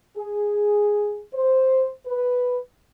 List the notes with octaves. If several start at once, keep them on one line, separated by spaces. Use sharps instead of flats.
G#4
C5
B4